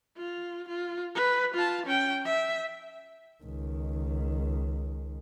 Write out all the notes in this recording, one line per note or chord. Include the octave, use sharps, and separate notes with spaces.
F4
F4
B4
F4 A5
C#4 G5
E5
C#2 D#3